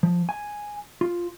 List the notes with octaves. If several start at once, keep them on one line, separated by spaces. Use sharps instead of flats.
F3
G#5
F4